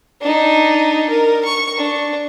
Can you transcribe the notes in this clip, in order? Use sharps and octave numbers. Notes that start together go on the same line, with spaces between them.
D4 D#4
A#4
C#6
D4